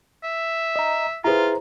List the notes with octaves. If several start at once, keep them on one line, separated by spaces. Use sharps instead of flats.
E5
D#5 A#5
E4 F4 G#4 B4 C5 A#5